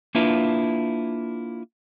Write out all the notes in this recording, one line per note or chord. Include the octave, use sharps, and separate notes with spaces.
A#3 D4 E4 F4 B4